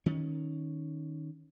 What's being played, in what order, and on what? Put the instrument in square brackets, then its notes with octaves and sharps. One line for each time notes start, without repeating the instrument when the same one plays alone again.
[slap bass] D#3 C#4